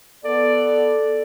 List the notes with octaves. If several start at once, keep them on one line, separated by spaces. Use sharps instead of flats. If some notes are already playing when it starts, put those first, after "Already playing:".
B3 A4 D5